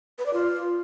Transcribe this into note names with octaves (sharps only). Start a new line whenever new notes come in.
B4
D5
F4